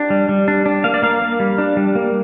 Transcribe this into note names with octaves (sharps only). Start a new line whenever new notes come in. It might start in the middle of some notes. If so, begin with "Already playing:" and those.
Already playing: D4 G4
G3
G3
D4
D4
A#3 F5
D5
A#3 F5
A#3
G3
D4
G3
A#3